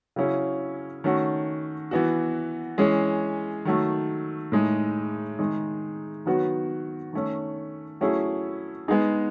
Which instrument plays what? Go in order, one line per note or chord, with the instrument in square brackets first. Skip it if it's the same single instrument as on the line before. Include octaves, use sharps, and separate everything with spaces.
[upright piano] C#3 F#3 C#4 E4 G#4
D#3 A3 C#4 F#4
E3 B3 F#4
E3 G#3 C#4 G#4
D#3 F#3 A3
A2 G#3 D#4
D#3 G#3 D#4
D#3 F#3 B3 F#4
D#3 A3 C#4
F#3 A3 C#4 E4 G#4
G#3 B3 D#4 G#4